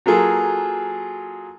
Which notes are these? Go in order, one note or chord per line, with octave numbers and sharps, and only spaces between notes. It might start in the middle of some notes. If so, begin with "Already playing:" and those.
F#3 A#3 F4 G#4 A4